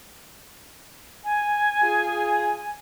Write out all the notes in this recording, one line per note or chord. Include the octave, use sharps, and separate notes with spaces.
G#5
F4 G#4